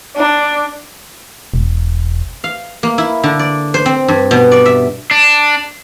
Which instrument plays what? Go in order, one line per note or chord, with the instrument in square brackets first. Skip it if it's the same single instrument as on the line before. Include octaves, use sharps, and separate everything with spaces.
[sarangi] D4
[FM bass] E1
[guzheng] F5
A#3
E4
D3
D5
C5
C4
G2
B2
D5
E5
[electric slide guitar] D4